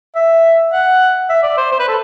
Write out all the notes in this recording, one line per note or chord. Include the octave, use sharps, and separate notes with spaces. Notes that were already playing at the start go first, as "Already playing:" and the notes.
E5
F#5
E5
D5
C5
C5
B4
A4